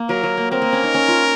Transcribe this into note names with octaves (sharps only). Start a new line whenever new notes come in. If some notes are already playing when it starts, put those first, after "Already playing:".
Already playing: A#3
F#3 A#4
F#3
A#3
C4 A#4
A#3
C#4
D#4
C#4
F4